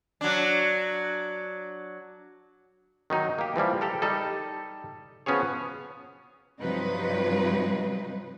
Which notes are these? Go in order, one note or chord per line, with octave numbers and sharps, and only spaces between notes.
F#3 D4
D#3 F#3 D#4
A#3 G4
E3 F3 G3 A#3
G4 A4 A#4
G3 D#4 A4
F3 B3 C#4 F#4 G#4 C#5
G2 C3 F3 F#3 D#4 B4